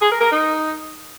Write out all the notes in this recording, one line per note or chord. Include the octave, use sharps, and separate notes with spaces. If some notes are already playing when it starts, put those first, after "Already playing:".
G#4
A#4
A#4
D#4